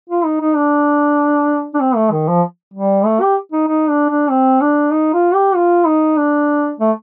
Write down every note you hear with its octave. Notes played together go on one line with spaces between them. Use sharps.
F4
D#4
D#4
D4
D4
C4
A3
D#3
F3
G3
A3
G4
D#4
D#4
D4
D4
C4
D4
D#4
F4
G4
F4
D#4
D4
A3